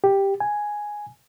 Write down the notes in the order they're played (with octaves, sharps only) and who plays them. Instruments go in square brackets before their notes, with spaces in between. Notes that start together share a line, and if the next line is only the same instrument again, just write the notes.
[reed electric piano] G4
G#5